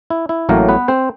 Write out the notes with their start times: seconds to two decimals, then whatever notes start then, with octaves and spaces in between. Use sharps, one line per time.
0.10 E4
0.29 E4
0.49 A1 A2 F#3 A3 A#3 A#4
0.68 B3 B4
0.88 C4 C5